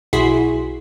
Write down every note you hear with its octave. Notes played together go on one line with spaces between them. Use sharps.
B1 E4 F#4 G#4 C6 B6